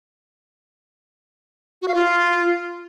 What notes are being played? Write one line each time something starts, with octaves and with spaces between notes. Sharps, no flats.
F#4
F5
F4